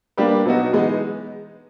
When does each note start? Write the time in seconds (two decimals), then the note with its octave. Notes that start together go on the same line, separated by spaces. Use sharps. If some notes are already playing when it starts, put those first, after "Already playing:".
0.17 G3 A#3 D4 G4 B4
0.45 B2 F#3 B3 D#4 F#4
0.73 E3 G#3 B3 D#4